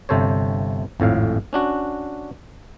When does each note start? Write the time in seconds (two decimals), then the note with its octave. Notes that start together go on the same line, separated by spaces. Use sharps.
0.09 G1 C3 A4 C5 C#5
1.00 G#1 F2 A2 F5
1.53 C#4 D4 F#4